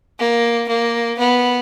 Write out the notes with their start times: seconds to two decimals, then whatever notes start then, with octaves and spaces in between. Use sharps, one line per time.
0.19 A#3
0.68 A#3
1.18 B3